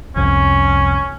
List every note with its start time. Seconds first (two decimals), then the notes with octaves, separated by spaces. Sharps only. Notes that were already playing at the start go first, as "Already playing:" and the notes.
0.16 C2 F2 C#4